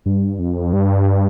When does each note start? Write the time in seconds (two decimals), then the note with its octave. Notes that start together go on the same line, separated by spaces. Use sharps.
0.06 G2
0.39 F2
0.73 G2